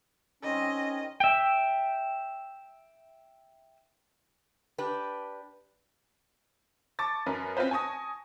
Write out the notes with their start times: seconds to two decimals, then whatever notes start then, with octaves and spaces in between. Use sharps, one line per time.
0.43 D#3 G3 C4 C#4 D#5
1.20 E5 G5
4.78 D4 G4 B4
6.99 A5 C#6 D6 A6
7.26 F#2 A#4 B4
7.57 C4 C#4 F4 B4 C5
7.71 G#5 A5 C#6 D#6 A#6